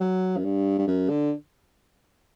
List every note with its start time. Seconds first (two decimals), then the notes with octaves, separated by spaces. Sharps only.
0.01 F#3
0.37 F#2
0.45 G2
0.79 G2
0.87 F#2
1.10 D3